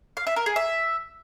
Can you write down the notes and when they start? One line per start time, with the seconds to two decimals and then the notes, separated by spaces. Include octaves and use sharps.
0.17 F5
0.27 E5
0.36 A#4
0.46 G#4
0.56 E5